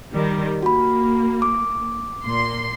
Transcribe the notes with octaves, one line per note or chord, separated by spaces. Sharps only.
D#3 G3
A#3 F#4 B5
D6
A#2 C6